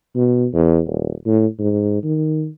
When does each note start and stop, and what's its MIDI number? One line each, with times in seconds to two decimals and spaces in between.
0.16 0.47 47
0.54 0.80 40
0.86 1.13 27
1.27 1.46 45
1.59 2.01 44
2.03 2.48 51